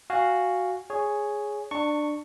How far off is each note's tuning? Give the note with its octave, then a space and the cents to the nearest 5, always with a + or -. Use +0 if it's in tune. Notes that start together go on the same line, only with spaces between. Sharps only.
F#4 +0 F5 +0 G#5 -20
G#4 +0 C#5 +0
D4 +15 A5 +40 C#6 +0